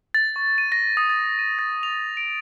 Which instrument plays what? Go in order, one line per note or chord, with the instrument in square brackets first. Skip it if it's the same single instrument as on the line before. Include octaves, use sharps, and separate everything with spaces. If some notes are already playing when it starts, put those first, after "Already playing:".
[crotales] A6
C#6
D#7
A#6
D#6
A6
D#7
A6
F7
D7